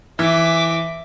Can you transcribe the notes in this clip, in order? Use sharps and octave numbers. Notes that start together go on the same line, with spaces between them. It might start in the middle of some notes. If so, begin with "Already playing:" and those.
E3 E5 D6